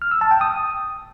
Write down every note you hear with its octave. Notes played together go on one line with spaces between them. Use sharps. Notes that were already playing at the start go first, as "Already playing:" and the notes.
F6
E6
A5
G5
D#6